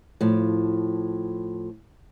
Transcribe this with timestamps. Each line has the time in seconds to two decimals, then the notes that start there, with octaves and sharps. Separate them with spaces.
0.21 A2 F3